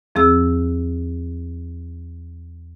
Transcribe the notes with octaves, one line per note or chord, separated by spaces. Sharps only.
E2 F3 C4 G#4 E6